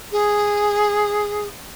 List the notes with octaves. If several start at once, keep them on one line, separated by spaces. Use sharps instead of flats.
G#4